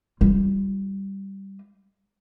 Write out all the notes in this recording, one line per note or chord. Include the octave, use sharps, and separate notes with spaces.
G3 F4